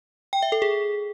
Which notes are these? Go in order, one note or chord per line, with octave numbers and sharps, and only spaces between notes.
G5
E5
A4
G#4